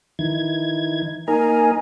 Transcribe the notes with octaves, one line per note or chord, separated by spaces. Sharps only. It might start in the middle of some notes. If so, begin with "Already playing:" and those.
D#3 E3 G#6
A#3 D#4 A#4 G#5